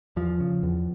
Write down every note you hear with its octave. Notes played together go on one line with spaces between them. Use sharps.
E2 F3
C#3
E2